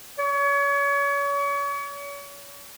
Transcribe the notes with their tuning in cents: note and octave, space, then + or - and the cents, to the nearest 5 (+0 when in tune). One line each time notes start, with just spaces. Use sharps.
C#5 +35